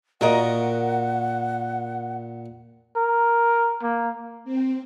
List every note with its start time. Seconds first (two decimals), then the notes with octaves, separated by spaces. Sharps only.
0.21 A#2 F#4 A#4 D#5 F#5
2.96 A#4
3.82 A#3
4.44 C4